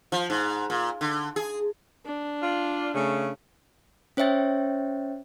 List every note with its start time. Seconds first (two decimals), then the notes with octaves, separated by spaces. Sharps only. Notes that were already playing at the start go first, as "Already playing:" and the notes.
0.12 F3
0.30 G#2
0.70 A#2
1.01 D3
1.36 G#4
2.06 D4
2.43 F4 D5
2.94 C#3 A3
4.17 C#4 C5 C#5 E5 G5 A6